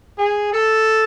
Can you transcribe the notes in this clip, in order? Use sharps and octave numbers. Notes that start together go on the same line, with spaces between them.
G#4
A4